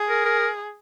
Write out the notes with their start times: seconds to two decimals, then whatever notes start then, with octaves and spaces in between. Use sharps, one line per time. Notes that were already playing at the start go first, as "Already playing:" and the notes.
Already playing: G#4
0.09 A#4
0.25 A#4